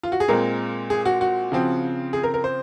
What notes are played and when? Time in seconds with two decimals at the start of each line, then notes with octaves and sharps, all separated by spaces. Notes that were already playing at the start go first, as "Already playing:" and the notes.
0.03 F4
0.12 F#4
0.20 G#4
0.28 A#2 G#3 C4 A#4
0.90 G#4
1.05 F#4
1.21 F#4
1.52 C#3 F3 C4
2.13 G#4
2.23 A#4
2.34 A#4
2.44 C5